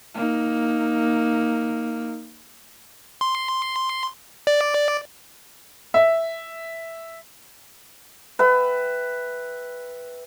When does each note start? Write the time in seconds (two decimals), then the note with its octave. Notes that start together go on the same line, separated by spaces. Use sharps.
0.15 A#3 D#4
3.21 C6
4.47 D5
5.94 E5
8.39 B4 E5 G5